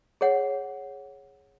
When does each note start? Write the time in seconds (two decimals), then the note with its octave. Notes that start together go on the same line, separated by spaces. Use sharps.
0.21 G#4 C#5 F#5